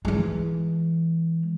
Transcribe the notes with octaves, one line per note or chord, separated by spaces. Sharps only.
E3 G#3